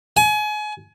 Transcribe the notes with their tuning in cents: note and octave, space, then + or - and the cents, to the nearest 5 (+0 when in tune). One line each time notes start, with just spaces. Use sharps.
G#5 +30